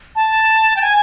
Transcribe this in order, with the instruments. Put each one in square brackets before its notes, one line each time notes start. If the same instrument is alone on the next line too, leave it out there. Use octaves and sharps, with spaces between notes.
[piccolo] A5
G5
G#5